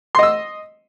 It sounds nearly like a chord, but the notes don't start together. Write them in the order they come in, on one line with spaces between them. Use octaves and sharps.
C6 D#5 E6